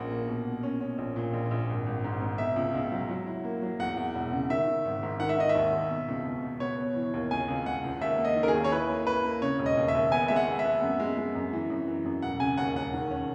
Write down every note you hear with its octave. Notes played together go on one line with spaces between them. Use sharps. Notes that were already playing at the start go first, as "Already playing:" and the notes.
Already playing: A#1 G#3 A#3 C#4 F#5
A#3
B2
B2
C#4
C#4
A#1
A#2
A#1
A#1
G#1
G#1
G#2
G#2
B2 E5
C#2
C#2
F#3
F#3
E4
A#3
F#3
E2 F#5
E2
E1
C#3
D#3 E5
D#3
G#1
G#2
D#3 F#5
E5
D#3 D#5
E5
D#2
D#2
B2
C#2
C#2
B2
B3 C#5
B3
E3
D#2
C#2 G#5
C#2
C#2 F#5
C#2
D#2 E5
A#3
D#5
D#3
A#4
G#4
D#2
C#5
E4 B4
A#3
E4 B4
A#3
C#3 C#5
E1
D#5
D#2
E5
D#2
B3 G#5
G#3 E5
F#5
B3
E5
B3
F#2
G#3
G#3
F#2
E3
F#2
E3
F#2
E1 F#5
C#3 G#5
D#2 F#5
E1 F#5
D#3
C#4